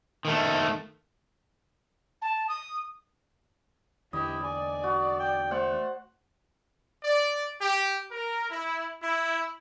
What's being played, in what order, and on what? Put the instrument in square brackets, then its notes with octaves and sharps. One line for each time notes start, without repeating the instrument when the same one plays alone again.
[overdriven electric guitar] D#3 A3
[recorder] A5
D#6
[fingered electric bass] E2 D3 [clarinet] E4 [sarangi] G4 [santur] D#5
[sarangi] D5 [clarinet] G#5
[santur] F#4
[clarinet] G5
[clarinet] A3 [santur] C5 F#5
[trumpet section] D5
G4
A#4
E4
E4